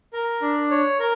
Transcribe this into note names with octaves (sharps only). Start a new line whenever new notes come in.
A#4
D4
C#5
A#4